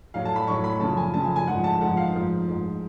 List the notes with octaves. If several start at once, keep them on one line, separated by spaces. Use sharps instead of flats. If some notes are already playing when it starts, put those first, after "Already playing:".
A2 F#3 F5
A5
B5
A2 F#3 C#6
B5
F#2 C#3 F3 A5
G#5
F#2 C#3 F3 A5
G#5
G#5
G#2 F3 F#5
A5
G#2 F3 F#5
F5
G#2 F3
G#2 F3